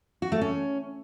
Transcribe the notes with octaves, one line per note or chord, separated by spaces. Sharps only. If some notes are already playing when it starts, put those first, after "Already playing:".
F#4
A3
C#4